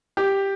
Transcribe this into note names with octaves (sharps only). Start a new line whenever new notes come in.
G4